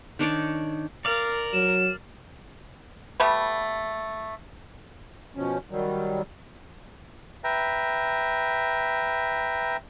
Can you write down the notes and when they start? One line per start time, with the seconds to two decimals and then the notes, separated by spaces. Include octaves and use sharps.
0.19 D#3 D4 C#5 D5
1.05 A#4 D5 F5
1.53 F#3 E7
3.20 G3 A3 B3
5.36 B2 F3 C#4
5.71 D#3 F#3 G3
7.44 B4 E5 G5 A#5